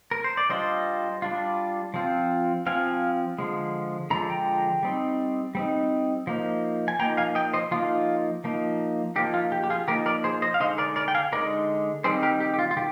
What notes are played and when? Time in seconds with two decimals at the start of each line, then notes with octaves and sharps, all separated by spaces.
0.11 A#4
0.24 C5
0.37 D5
0.50 G3 D4 F4 C5 D#5
1.22 G3 D4 F4
1.94 F3 C4 F4
2.66 F3 C4 F4 F5 G#5
3.38 D3 F3 G#3
4.10 D3 F3 G#3 A#5
4.30 G5 A#5
4.83 G3 C4 D#4
5.55 G3 C4 D#4
6.27 F3 A#3 D#4
6.88 G#5
6.99 F3 A#3 D#4 G5 A#5
7.17 F5 G#5
7.35 D#5 G5
7.53 C5 D#5
7.71 F3 A#3 D#4 F4
8.44 F3 A#3 D#4
9.16 F3 A#3 D#4 G4
9.34 F4
9.52 G4
9.64 G4
9.70 F4 G#4
9.88 F3 A#3 D#4 G4 A#4
10.06 A#4 D5
10.24 G#4 C5
10.42 C5 D#5
10.54 F5
10.60 D3 G#3 D#4 C5 D#5
10.78 A#4 D5
10.96 A#4 D5
11.08 G5
11.14 F5 G#5
11.32 D3 G#3 D#4 A#4 D5
12.04 D#3 G3 C4 D#4 G#4 C5
12.23 G4 A#4
12.40 G4
12.54 G4
12.59 F4
12.71 F4
12.77 D#3 G4